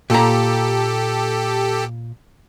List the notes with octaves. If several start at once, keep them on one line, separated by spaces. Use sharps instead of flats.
A#2 G4 A4 A#5